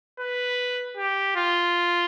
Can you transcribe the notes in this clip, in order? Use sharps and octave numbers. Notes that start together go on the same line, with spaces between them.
B4
G4
F4